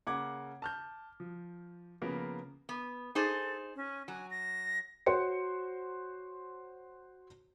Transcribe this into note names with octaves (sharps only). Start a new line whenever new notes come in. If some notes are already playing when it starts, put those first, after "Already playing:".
C#3 A#3 F#5 D6 G#6
A5 F6 G6
F3
C#3 F3 A#3 B3 A#4
B3
D#4 G#4 A4 C5
C#4
F#3 G#5
A#6
F#4 C5 C#5 C#7